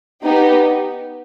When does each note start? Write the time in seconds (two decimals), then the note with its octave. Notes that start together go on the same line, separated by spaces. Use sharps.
0.23 B3 D#4 G4